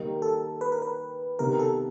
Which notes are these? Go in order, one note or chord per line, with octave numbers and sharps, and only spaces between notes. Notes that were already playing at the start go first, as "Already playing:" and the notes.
Already playing: D#3 G3 A#3 D#4
A4
B4
A#4
B4
C3 D#3 G3 B3 A#4
A4